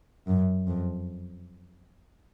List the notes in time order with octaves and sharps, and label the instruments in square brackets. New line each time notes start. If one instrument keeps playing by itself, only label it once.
[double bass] F#2
F2